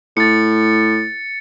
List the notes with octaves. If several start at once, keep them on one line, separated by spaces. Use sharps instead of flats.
A2 A6 C#7